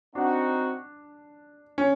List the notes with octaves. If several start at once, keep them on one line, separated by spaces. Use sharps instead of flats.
C4 D4 D#4 F#4
C#4